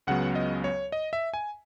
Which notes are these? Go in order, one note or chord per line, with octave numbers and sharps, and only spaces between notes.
C#2 C#3 F#3 B3 F#5
D#5
C#5
D#5
E5
G#5